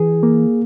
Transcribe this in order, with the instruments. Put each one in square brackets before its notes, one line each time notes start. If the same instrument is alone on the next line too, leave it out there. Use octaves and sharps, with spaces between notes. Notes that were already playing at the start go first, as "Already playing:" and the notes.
Already playing: [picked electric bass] E3 [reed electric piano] G#4
[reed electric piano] A#3